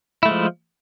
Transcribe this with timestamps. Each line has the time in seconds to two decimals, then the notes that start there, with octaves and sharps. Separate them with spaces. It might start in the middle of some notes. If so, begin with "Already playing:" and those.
0.23 E4
0.25 A3
0.28 G#3
0.31 F3